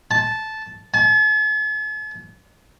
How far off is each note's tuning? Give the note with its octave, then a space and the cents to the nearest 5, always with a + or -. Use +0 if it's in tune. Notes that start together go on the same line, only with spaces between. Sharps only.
A5 -10
A5 -45